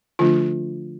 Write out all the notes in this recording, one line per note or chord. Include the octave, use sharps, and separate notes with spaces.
D3 F3 A3 D4 F4